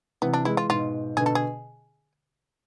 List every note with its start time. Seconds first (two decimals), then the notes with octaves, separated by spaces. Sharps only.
0.22 C3 E3 B3
0.33 D4
0.45 E3 G#3 E4
0.57 F4
0.70 G#2 B2 F4
1.17 B2 D3 G#4
1.26 A4
1.35 G#4